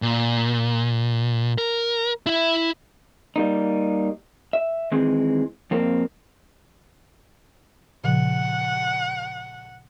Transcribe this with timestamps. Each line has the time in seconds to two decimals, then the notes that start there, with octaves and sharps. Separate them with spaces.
0.02 A#2
1.58 A#4
2.27 E4 E5
3.36 G3 A#3 D#4
4.53 E5
4.92 D#3 E3 G#3 C4
5.71 F2 A#3 C4
8.04 A#2 C#3 F3 F#5